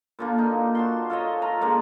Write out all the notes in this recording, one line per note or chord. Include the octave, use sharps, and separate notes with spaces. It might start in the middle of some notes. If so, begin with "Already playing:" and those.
A#2 D3 A#3
D#4
F#4 A5 C6
F4 A4 C#5 D#5
F4 A#5
D3 G#3 A#3 D#4